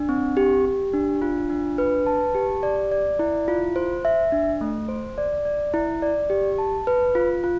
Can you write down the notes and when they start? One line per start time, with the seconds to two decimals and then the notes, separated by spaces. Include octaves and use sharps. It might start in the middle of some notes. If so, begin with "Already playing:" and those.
Already playing: D4
0.09 C4
0.37 G4
0.65 G4
0.93 D4
1.22 F4
1.50 D4
1.78 B4
2.06 A5
2.35 G4
2.63 D5
2.92 D5
3.19 E4
3.48 F4
3.76 C5
4.05 E5
4.32 D4
4.61 A3
4.88 C5
5.18 D5
5.45 D5
5.74 E4
6.02 D5
6.30 G4
6.58 A5
6.87 B4
7.15 F4
7.44 F4